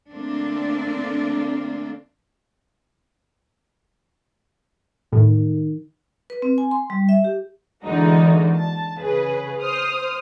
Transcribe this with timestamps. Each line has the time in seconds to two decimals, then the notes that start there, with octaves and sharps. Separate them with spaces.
0.11 D3 A3 A#3 C4 D4
5.13 A2 D#3
6.30 B4
6.42 C4
6.58 G#5
6.71 C6
6.90 G3
7.09 E5
7.24 G4
7.85 D3 E3 G#3 A#3 D#4 F#4
8.56 A5
8.97 C#3 G#4 B4
9.60 C5 D#6 F6